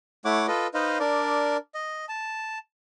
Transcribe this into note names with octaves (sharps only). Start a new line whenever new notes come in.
A3 E4 C#5 F#5 D6
F4 A4 B4 D#5
D#4 B4 C5 D#5 F5
D4 A#4 D5
D#5
A5